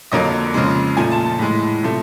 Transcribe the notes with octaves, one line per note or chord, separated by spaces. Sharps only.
F2 D3 F#3 A#3 D#5
F2 C#3 F3 G#3
A#2 F3 A3 G#5
A5
A5
A2 E3 G#3
C3 F3 A3